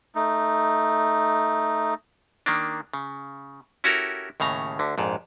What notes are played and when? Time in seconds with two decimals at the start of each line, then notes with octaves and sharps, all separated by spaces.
0.15 A3 D#4
2.46 D#3 A#3 D4
2.93 C#3
3.84 C#4 E4 F#4 G4 A4 A#4
4.40 D#2 A2 C#3 A#5
4.79 D2 D3
4.98 A#1 F2 G#2